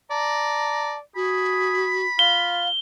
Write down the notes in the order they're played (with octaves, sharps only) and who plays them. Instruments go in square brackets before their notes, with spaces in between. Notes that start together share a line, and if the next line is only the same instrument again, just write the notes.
[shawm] D5 [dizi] A5 [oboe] A#5
[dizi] F#4 [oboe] G#4 [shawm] B5
[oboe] F4 [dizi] F5 [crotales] G7